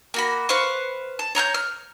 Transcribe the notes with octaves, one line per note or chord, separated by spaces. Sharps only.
A#3 F#4 B5
B4 C5 F5 C#6
A5
C#5 A#5 F#6 G6
F6